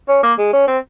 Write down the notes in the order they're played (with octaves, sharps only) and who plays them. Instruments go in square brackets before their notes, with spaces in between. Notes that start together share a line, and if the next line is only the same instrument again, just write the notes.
[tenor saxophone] C#4
A#3
G#3
C#4
C4